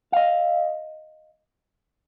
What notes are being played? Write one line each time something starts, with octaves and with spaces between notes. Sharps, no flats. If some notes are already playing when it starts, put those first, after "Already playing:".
D#5 F5